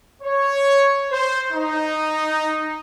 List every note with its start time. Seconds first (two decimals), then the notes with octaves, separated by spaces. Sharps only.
0.22 C#5
1.10 C5
1.53 D#4